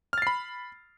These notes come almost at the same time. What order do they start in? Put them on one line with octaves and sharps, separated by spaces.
F6 A6 C7 B5